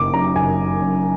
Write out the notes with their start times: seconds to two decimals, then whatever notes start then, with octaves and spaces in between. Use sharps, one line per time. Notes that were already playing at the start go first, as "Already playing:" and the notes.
Already playing: F#1 D#3 D6
0.13 F#2 A#5
0.36 F#1 G#5
0.58 D#3
0.82 F#2